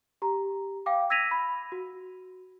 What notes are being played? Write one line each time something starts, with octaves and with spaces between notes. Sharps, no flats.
G4 A#5
F5 G5 D6
E6 G#6 A#6 B6 D#7 F7
B5
F#4